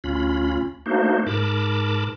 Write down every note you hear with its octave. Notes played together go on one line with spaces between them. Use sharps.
D2 C#4 F4 B5
A3 A#3 D4 D#4 F#4 C5
G#2 A#4 A5 B5 D6